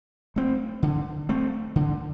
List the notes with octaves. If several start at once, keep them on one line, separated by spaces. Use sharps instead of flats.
A3 C4
D3
A3 C4
D3